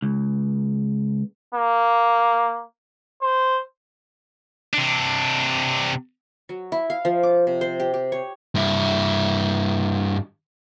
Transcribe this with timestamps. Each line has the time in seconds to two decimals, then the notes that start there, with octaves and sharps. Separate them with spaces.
0.02 C#2
1.55 A#3
3.22 C5
4.74 C3 D4
6.49 F#3
6.72 E4
6.90 F5
7.05 F3
7.23 D6
7.47 C3
7.61 C5
7.80 G4
7.94 G4
8.12 C#5
8.55 G2 E4